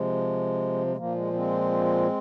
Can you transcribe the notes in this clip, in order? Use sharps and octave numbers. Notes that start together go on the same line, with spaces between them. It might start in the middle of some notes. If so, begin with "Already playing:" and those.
Already playing: C3 F3 G#3
G#3
A#2 F3 A#3
G#3
G#3 C4